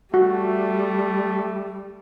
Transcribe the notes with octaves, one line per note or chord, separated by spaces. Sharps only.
G3 A3 F#4